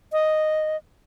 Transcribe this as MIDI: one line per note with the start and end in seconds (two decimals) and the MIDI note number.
0.12 0.77 75